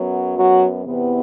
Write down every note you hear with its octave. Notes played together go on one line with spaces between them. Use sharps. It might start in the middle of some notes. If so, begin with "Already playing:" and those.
Already playing: F#2 F#3 B3
F#3 F#4
E2 C3 E3 B3